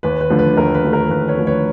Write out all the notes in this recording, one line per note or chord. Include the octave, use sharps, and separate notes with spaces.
D#2 B4
B4
D3 F3 A3
B4
D#2 A#4
B4
D3 F3 A3
A#4
D#2 B4
B4 C#5
D3 F3 A3
B4 C#5